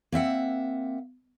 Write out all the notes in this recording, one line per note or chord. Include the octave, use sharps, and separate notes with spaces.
A#3 C4 E5 F#5